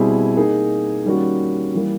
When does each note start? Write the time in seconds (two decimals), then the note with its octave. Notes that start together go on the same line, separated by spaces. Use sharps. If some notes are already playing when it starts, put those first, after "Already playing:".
Already playing: B2 G3 C4 E4 G#4
0.36 A#3 D#4 G#4
1.05 D#3 G3 A#3 C#4 F#4
1.74 E3 G3 A#3